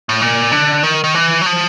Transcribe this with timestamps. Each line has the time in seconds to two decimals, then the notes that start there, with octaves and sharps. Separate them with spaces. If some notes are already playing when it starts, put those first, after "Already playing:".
0.09 A2
0.21 A#2
0.52 D3
0.83 D#3
1.04 D#3
1.15 E3
1.42 F#3
1.46 F3